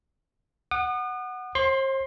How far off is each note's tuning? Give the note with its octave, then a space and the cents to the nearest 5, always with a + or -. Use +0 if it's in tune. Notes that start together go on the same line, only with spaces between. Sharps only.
F#5 +0 D#6 -40
C5 +40 C6 +10